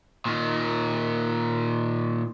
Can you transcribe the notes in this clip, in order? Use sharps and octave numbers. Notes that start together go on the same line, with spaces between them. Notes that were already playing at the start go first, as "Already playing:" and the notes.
A#2 D#3